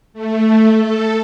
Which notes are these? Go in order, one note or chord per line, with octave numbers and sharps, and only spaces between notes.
A3
A4